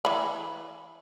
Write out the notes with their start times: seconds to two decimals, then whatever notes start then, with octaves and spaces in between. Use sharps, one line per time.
0.05 E3 B5